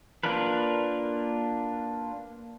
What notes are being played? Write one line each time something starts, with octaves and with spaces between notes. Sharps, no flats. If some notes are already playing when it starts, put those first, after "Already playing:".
A#3 D4 F4 A#4 B4